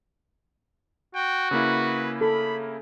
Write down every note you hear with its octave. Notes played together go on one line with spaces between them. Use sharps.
F#4 G5
C#3 A#3 E4 B4
A4 B5